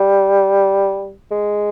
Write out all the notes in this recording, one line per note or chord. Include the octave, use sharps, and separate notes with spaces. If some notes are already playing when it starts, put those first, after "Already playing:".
Already playing: G3
G#3